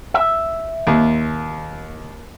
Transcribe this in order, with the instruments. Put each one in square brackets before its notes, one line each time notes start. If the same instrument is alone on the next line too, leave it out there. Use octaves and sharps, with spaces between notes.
[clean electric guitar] E5
[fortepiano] D#2